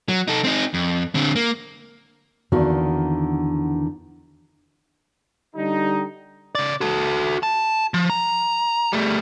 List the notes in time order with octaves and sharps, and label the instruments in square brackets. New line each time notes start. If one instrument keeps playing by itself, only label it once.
[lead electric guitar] F#3
D#4 A4
C4 D#4
F2
D3 C4
A#3
[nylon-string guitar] E2 D3 D#3 A#3 F#4 F#5
[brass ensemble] D3 G3 D#4
[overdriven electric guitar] C#3 D5
F#4 A4
A5
F3
A#5
G3 A3